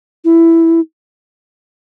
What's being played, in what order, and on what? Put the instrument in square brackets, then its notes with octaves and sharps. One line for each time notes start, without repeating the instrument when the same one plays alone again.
[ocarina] E4